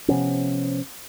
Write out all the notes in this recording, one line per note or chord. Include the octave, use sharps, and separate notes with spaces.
C3 F3 B3 C#4